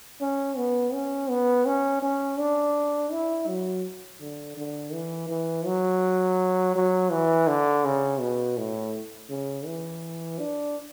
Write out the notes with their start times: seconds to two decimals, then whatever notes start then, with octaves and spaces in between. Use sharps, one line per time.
0.21 C#4
0.57 B3
0.93 C#4
1.29 B3
1.66 C#4
2.02 C#4
2.39 D4
3.12 E4
3.47 F#3
4.20 D3
4.57 D3
4.93 E3
5.29 E3
5.66 F#3
6.75 F#3
7.11 E3
7.47 D3
7.85 C#3
8.20 B2
8.57 A2
9.30 C#3
9.66 E3
10.39 D4